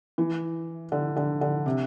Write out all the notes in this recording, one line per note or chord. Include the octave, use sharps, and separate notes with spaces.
E3
D3
D3
D3
C3